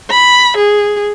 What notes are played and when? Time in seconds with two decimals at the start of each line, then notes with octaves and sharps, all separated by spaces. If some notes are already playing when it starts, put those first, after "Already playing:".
0.10 B5
0.57 G#4